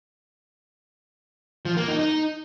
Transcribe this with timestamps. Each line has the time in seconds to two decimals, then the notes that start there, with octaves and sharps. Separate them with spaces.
1.65 F3
1.77 A#3
1.88 D#4
1.99 D#4